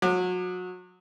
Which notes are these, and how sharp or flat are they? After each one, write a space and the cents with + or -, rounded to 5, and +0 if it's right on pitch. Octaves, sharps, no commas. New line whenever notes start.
F#3 -30 D6 +35